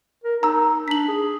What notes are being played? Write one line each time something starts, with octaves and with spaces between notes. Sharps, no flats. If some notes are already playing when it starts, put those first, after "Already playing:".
A#4
D#4 A#5 E6
D4 B6 F#7
G#4